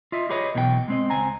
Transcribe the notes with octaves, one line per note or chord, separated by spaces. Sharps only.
F4 D#5 E5
G4 G#4 B4 C#5 D#5
B1 B2 E3 B3 A4 G5
G#3 C4 D#5
C#2 C4 G#5 A#5